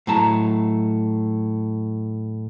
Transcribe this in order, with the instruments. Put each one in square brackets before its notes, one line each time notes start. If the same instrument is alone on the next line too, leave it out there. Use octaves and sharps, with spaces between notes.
[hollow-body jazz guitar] A2 F#3 A5 A#5